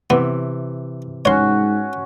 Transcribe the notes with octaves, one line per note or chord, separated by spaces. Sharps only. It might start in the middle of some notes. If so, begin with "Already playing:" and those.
C3 E3 B3
G#2 C#4 F#4 C#5 C6